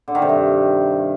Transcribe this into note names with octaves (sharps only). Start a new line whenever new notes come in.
D3
D#3
C3
G2